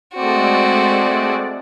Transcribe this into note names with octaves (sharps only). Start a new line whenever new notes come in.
G#3 A3 C4 F#4 D5